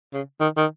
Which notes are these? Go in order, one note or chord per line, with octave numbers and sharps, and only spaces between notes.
C#3
D#3
D#3